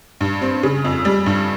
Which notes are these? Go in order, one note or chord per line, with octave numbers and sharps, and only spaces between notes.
G2
C4
C#3
F2
G3
G2